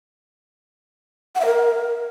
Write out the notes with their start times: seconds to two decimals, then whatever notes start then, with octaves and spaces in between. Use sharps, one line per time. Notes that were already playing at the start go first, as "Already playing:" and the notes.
1.35 F#5
1.40 E5
1.45 A#4